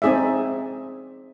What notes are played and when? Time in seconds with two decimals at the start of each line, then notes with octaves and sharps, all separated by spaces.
0.02 C4 D#4 G#4 D5 E5